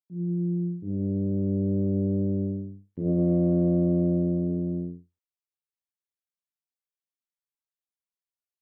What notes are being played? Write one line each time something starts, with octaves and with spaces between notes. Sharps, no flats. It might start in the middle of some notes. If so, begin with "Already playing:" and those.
F3
G2
F2